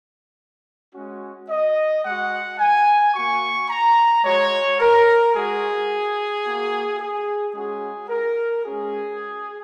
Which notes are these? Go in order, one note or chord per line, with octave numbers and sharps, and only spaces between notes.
G#3 C#4 F#4
D#5
G#3 F#4 F#5
G#5
A#3 F#4 C#6
A#5
G#3 F#4 C#5
A#4
G#3 F#4 G#4
A#3 F#4
G#4
G#3 C#4 F#4 G#4
A#4
G#3 C#4 F#4 G#4